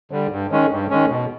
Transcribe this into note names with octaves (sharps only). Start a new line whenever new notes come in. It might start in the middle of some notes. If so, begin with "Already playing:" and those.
D3 G3
G2
D#3 G#3 C#4
G2
D#3 G#3 C#4
B2